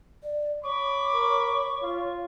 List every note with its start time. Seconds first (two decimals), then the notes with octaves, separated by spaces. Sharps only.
0.23 D5
0.64 C#5 B5 C#6 D6
1.13 A#4
1.83 F4